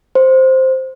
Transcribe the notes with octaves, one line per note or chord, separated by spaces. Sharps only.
C5